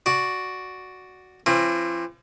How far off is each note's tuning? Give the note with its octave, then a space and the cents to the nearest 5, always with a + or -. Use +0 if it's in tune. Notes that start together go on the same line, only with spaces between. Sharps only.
F#4 +0 D5 +0
F3 -45 C4 +45